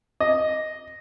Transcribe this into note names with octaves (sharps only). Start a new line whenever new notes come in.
D#5